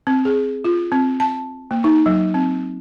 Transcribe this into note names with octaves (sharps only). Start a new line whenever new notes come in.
C4
G#4
F4
C4
A5
A#3
D#4
F#3
C4